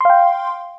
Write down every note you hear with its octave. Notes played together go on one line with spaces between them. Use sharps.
F5 G5 C6